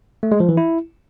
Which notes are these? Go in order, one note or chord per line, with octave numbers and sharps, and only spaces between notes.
A3
G#3
F3
E3
E4